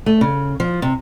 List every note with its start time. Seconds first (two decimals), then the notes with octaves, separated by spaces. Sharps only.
0.06 A3
0.21 C#3
0.60 F3
0.82 C3